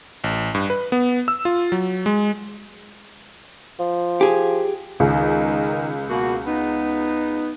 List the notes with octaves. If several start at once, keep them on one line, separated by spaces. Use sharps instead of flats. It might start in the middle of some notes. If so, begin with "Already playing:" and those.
A1
G2
B4
B3
E6
F4
F#3
G#3
F3
G4 G#4
C#2 D#3
B2 A#3 F#4
B3 D#4